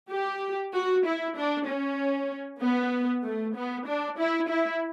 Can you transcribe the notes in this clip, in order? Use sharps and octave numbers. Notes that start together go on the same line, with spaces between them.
G4
F#4
E4
D4
C#4
B3
A3
B3
D4
E4
E4